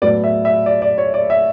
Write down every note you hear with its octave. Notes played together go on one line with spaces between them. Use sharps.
A2 F#3 B3 D5
E5
E5
D5
D5
C#5
D5
E5